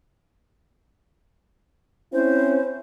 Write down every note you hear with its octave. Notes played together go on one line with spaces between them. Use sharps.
C4 C#4 E4 C5